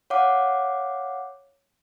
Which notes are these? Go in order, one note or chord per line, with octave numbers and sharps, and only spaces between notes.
C#5 F5 F#5 D6